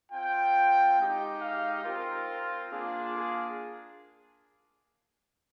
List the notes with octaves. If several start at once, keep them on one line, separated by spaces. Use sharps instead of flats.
C4 F4 G5
G#3 D#4 G4
F5
C4 F4 A#4
A#3 D4 F4 G#4
G#4